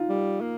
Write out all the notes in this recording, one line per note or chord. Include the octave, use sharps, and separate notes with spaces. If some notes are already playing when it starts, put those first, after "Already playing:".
Already playing: D#4 F4
G3
A#3